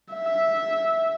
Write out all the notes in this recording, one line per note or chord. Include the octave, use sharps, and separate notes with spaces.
E5